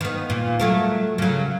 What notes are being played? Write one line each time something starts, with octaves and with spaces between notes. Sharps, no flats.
D#3 B3
A#2
F#3 A3 A#4
C#3 F#3